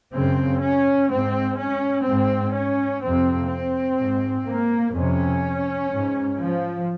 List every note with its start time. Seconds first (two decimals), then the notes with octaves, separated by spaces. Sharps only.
0.13 F#2 C#3 C4
0.61 C#4
1.09 G#2 C4
1.58 C#4
2.06 G#2 C4
2.53 C#4
3.02 F2 C3 C4
3.50 C4
3.98 G#2
4.46 A#3
4.94 F2 C3 C#4
5.90 G#2
6.38 F3